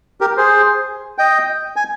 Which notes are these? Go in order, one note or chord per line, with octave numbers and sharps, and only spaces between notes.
G4 A#4
G#4 C5
D#5 G5
G#5